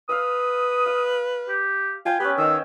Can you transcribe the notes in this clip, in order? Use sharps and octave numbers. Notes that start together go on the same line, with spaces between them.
B4 F5 D#6 E6
F5
G4
F4 C5 G5 G#5
B3 C#4 G4 B4
D#3 D#5 F5 E6